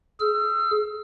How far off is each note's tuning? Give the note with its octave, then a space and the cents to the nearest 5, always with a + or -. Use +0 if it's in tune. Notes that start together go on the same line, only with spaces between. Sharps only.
G#4 +35 E6 +45